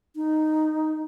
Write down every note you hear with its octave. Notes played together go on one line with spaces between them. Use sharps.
D#4